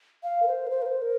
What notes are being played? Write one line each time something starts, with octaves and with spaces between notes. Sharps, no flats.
F5
A#4
C5
A#4
C5
A#4
C5
A#4